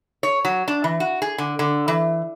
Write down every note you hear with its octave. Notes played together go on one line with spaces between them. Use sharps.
C#5
F#3
D4
E3
F#4
G#4
D3
D3
E3